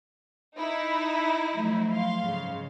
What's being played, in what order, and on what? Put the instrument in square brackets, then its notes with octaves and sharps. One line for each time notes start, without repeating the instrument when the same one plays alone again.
[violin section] D#4 E4
[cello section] F3 F#3 A3
[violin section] F5 C6
[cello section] G#2 C#3